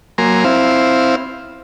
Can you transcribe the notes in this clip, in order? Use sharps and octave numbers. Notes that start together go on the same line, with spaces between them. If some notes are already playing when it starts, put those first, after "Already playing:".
F#3 A#3 G#5 A#5 C6
C4 E4 C5 F5